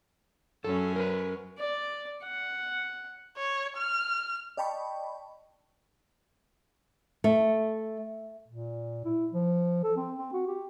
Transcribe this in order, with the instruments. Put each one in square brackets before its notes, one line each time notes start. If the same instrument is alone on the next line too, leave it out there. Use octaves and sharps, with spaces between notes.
[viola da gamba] F#2 C#4 [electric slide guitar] A4
[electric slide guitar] A#4 B4
[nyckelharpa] D5
F#5
[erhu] C#5
F6
[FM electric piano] D5 D#5 G5 A5 B5 C#6
[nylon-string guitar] A3
[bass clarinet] A#2
E4
F3
A4
C4
C4
F#4
G4